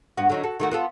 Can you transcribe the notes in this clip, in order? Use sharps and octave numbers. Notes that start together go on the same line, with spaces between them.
G2 B3 F#4
D3 F#3 D#4
F#4 A4
D#3 A3 F#4
B3 F4 A4